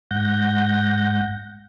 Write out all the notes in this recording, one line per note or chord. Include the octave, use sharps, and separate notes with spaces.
G#2 F#5 G6 A#6